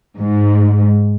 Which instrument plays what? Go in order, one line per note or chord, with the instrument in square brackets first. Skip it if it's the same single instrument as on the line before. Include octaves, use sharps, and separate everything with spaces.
[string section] G#2